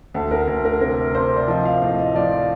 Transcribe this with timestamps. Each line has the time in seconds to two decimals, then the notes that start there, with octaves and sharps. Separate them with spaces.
0.14 D2 A4
0.31 A#4
0.48 D2
0.65 A#4
0.81 C3 A#4
1.14 C3 C5
1.36 D5
1.48 F3 D#5
1.65 F5
1.82 A2 D#5
1.99 D#5
2.15 F3 D5
2.32 D5